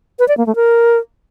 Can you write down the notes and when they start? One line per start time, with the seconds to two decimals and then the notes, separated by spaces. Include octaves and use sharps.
0.19 B4
0.28 D5
0.37 A#3
0.47 A3
0.56 A#4